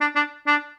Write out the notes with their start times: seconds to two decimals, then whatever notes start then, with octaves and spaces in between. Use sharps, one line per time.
0.01 D4
0.16 D4
0.47 D4